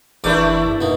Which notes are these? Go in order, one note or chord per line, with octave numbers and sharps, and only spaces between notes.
F#1 E2 A3 D4 E4 A#4 D6
F#2
B2 A#3 D#4